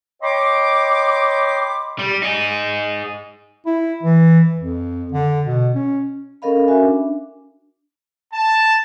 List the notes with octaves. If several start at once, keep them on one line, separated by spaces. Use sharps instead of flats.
C#5 D#5 G5 B5 C6 D6
G3
D#4 G#4
E4
E3
F2
D3
B2
C#4
C#4 A4 A#4 D#5 F5 B5
C#4 F#4 A#4 E5 G#5
D4
A5